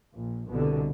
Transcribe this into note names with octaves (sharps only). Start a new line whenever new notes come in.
A#1
C2 B2 D3